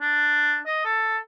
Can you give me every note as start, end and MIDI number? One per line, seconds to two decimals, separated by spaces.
0.01 0.59 62
0.66 0.81 75
0.85 1.17 69